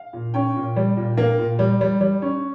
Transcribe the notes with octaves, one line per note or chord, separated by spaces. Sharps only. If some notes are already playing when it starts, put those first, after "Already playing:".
Already playing: F5
A#2
C#4 G5
A#2
G3
A#2
A#3
A#2
G3
G3
G3
C#4